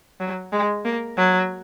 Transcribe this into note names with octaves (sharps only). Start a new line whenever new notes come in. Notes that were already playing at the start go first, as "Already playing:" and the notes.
F#3
G#3
A#3
F#3